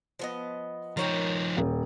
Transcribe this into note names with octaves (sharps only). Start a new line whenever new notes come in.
F3 B3 D#5
F3 D#4 A#4 C#5 G5
D#1